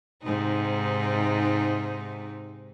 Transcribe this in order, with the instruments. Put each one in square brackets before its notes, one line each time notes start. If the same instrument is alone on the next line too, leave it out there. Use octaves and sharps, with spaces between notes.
[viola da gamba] G#2 C3 D#4